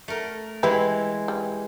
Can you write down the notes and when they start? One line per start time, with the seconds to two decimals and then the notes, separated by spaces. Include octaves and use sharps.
0.08 A3 A#4
0.63 E3 G#3 G4 B4 E5
1.28 G3